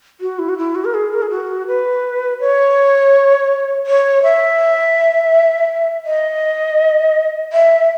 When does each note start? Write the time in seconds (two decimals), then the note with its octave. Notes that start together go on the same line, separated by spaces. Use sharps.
0.21 F#4
0.39 E4
0.49 F#4
0.58 E4
0.75 F#4
0.85 A#4
0.94 G#4
1.14 A#4
1.22 G#4
1.30 F#4
1.67 B4
2.40 C#5
3.86 C#5
4.23 E5
6.06 D#5
7.53 E5